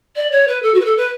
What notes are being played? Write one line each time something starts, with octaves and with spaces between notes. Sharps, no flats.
D5
C#5
B4
A4
F#4
B4
A4
B4